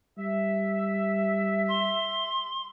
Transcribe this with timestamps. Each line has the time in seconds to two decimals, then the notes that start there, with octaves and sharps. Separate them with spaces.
0.18 G3 E5
1.68 C6